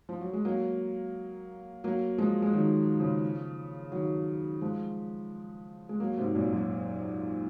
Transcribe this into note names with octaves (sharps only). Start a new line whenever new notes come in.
F3
F#3
G#3
F#3 A#3
F#3 A#3
F3 G#3
G#3
D#3 F#3
C#3 F3
D#3 F#3
F3 G#3
G#3
F#3 A#3
G#2 C3
F#2 A#2
F#2